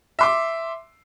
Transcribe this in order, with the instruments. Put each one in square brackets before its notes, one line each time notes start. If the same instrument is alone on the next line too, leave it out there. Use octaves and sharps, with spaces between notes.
[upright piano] E5 C6 D6